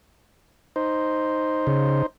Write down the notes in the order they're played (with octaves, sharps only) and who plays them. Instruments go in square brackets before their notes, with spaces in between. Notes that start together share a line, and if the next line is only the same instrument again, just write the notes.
[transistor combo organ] D#4 C5
[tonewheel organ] C#3